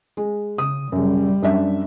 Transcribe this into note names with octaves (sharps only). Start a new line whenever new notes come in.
G#3
C#3 D#6
F#2 C#3 G3
F#2 D4 E5